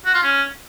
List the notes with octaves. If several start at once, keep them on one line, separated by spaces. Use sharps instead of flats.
F#4
F4
C#4